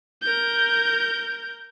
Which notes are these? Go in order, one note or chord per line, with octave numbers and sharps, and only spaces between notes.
A#4 G6